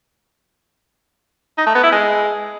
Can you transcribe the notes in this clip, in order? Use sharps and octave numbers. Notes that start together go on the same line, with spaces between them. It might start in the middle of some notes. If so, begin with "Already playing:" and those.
D#4
A3
B3
E4
G#3